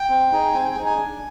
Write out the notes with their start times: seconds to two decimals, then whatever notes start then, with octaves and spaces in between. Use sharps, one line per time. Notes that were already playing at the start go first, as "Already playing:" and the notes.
Already playing: G5
0.09 C4
0.32 D#4 G#4
0.53 C4 G#5
0.65 G5
0.75 D#4 G#4 G#5
0.86 G#5
0.97 D4